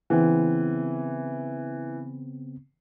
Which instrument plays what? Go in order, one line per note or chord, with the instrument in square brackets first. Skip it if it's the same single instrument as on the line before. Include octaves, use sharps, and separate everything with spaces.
[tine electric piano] C#3 B3 C4 [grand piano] E3